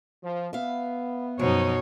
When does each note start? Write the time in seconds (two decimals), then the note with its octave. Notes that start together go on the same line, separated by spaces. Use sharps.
0.22 F3
0.53 B3 E5 F5
1.39 F#2 B2 F3 D#4 C#5